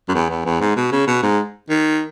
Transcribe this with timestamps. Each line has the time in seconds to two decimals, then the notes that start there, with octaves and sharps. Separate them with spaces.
0.09 F#2
0.14 E2
0.30 E2
0.45 E2
0.61 G#2
0.76 B2
0.92 C#3
1.07 B2
1.23 G#2
1.69 D#3